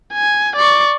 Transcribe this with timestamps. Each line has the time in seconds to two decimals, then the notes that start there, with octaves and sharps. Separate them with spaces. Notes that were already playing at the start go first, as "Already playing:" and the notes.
0.13 G#5
0.56 D5 C#6